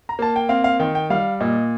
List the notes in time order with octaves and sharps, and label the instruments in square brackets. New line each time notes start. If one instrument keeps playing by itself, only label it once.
[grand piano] A#5
A#3 A5
G5
C4 F5
F5
D#3 G5
G5
G3 F5
A#2 D#5